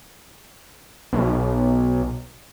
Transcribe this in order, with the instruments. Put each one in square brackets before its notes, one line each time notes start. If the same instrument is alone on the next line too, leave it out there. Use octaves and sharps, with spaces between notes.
[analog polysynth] B1